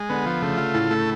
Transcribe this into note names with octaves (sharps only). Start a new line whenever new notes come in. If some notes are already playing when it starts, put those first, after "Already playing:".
Already playing: G#3
D3 B3
F3
C#3 A3
F4
A2 A4
A3